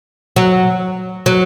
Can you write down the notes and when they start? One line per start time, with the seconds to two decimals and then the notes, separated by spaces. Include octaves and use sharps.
0.36 F#3
1.26 F#3